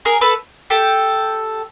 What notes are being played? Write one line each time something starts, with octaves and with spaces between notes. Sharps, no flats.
G#4 A#4
A4 B4
G4 A4